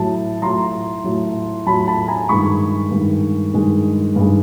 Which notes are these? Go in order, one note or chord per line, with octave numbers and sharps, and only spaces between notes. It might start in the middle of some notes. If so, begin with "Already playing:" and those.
Already playing: A2 F#3 A5
A2 F#3 A#5 C6
A2 F#3
A2 F#3 A5 B5
A5 B5
G#5 A#5
G2 D#3 G#3 B5 C#6
G2 D#3 G#3
G2 D#3 G#3
G2 D#3 G#3